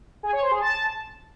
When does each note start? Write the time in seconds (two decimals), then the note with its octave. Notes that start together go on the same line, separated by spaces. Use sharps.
0.23 G#4
0.33 C#5
0.42 C5
0.51 G#4
0.61 A5